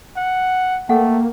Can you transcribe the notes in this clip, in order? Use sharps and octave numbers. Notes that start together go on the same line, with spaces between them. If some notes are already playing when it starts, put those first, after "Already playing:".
F#5
A3 A#3 A4 F#5 G5